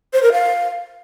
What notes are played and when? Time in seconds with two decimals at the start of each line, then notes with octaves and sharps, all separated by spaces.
0.13 C5
0.23 A#4
0.32 F5